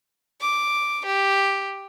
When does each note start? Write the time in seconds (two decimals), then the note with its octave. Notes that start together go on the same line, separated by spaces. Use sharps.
0.40 D6
1.06 G4